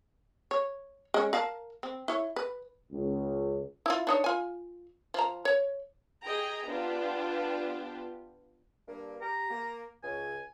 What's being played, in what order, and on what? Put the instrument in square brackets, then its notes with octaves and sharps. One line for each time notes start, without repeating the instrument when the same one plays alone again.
[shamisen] C#5
G#3 C#4
A#4 F5 A5
C4
E4 C#5
B4
[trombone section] C#2
[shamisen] E4 F4
D4 D#4 C#5
F4 G#5
F3 A#5
C#5
[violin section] G4 G#4 D#5 G5 A#5
B3 D4 F4 G4
[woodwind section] G2 A#3
[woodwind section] G4 [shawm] A#5
[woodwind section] A#3
[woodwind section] C#2 [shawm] G#5